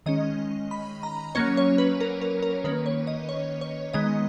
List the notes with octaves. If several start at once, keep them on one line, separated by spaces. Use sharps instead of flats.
D#3 G#3 C#4 D#5
B5
A#5
F#3 A#3 C#4 C#5
C#5
B4
A#4
A#4
A#4
D#3 A#3 C#4 B4
C#5
D#5
C#5
C#5
D#3 G#3 B3 D#5